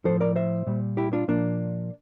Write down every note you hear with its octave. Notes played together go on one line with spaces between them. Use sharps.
A2 F3 A4 C5
A#4 D5
C5 E5
A#2 G3
E4 G4
D4 F4
A#2 F3 A#3 D4